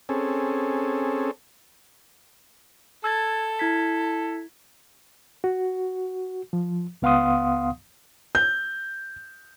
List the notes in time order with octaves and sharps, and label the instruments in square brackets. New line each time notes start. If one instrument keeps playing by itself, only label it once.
[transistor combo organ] C4 C#4 G#4 A4
[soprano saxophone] A4 [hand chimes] E6 G#6 A6
[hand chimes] E4 G#6 B6
[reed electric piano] F#4
F3
C#2 B3 F5 F#5 C6 D#6
[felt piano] G6